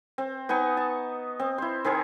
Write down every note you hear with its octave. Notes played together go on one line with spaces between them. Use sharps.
C4
B3 D#4 G#5 C#6
A5
C4
E4 C5
D#3 C4 G#4 A#4